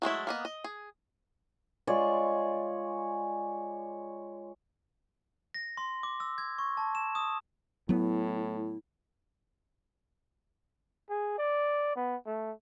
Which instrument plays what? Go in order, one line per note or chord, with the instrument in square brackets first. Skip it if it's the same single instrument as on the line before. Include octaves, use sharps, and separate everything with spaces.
[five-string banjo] F#3 G#3 A3 E4
A#3 B3 D#5
D#5
G#4
[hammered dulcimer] G#3 F4 C#5 D5
[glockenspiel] A#6
C6
D6
E6
G#6
C#6
A5
E7
D#6
[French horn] A2 [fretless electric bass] F#3 B3 [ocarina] E4
[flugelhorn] G#4
D5
B3
A3